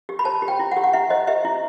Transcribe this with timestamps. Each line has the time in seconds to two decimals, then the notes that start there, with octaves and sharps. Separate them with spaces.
0.09 G4
0.19 B5
0.25 C5 A5
0.42 G4
0.48 G5
0.59 E4
0.71 F#5
0.77 G4
0.84 F#5
0.93 E4 E5
1.10 C5 D#5
1.27 G4 E5
1.45 E4